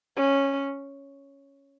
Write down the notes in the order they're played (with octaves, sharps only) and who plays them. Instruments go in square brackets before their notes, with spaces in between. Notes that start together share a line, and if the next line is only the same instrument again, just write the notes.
[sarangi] C#4